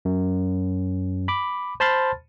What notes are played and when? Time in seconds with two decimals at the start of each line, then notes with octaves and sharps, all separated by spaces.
0.05 F#2
1.28 B5 D6
1.80 C5 A5 B5 C6 F6 A6